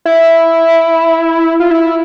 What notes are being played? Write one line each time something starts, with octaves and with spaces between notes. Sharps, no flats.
E4
F4
E4